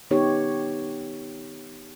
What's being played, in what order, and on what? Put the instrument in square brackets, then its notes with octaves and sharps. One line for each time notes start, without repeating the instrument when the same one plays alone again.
[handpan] D#3 B3 D#4 G4 C#5